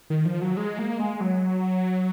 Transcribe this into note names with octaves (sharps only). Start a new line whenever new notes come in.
D#3
F3
F#3
G#3
A#3
G#3
F#3